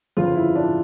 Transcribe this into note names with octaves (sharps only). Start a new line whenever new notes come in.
G1 F2 C#3 F3 F4
E4
D4